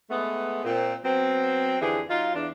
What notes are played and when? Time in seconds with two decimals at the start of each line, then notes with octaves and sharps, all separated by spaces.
0.10 G#3 A3 B3
0.64 A#2 C4
1.04 F#3 B3 C4
1.80 F2 D3 E3 G4 G#4
2.09 F#3 D#4 F4
2.34 E2 D4